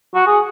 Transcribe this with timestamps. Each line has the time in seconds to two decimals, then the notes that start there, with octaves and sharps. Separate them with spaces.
0.15 F#4
0.27 G#4